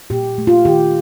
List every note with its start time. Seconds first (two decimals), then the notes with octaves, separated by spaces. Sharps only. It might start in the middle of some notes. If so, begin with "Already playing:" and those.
0.10 A#2 G4
0.38 A3
0.47 F4
0.65 D#3 G4